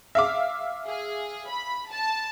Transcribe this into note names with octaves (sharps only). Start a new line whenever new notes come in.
E5 F5 D6
G#4
B5
A5